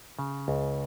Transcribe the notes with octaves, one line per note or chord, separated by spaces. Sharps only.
C#3
C#2